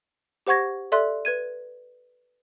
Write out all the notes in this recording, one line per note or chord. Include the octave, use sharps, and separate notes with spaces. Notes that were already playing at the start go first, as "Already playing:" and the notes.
G4 C5 F#5 C#6 G#6 A#6
A4 D5 E5 C6 F#6
B4 G#6 D#7